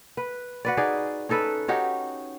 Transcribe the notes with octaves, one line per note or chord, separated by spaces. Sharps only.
B4
F#4 B4 D5
D#4 G#4 D5
C#4 D#4 A4 B4
C#4 D#4 F#4 G4